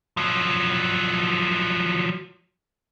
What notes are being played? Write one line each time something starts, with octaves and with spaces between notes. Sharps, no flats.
F3 F#3